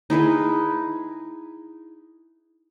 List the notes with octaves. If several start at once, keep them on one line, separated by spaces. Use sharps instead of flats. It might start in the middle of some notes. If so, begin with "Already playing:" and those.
D#4 E4 G#4 B4